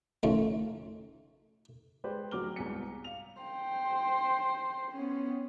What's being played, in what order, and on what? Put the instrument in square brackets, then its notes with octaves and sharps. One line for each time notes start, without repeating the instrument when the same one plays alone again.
[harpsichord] F2 D#3 A3 C#4 F4
[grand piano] G#3 G4 B4 C5 D5
A1 F#3 F#4 D6 F6 G7
C2 G#2 B3 G#5 B6 C#7
A#5
F5 F7
[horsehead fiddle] C5 G5
B3 C#4